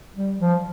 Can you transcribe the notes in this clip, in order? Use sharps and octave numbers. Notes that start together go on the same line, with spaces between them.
G3
F3